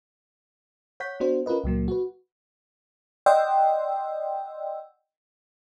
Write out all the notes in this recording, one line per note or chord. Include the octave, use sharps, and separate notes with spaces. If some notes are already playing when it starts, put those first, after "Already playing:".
C#5 F#5 G6 B6
B3 D4 F#4 C5
C#4 F4 A#4 B4 D#5
C#2 A#2 F#3 A#3
F#4 B4
D5 D#5 F#5 G5 C6 E6